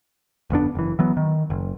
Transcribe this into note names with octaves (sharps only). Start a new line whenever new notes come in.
G1 F2 B3 D4
F#1 E3
E3 F#3 B3
D#3
F#1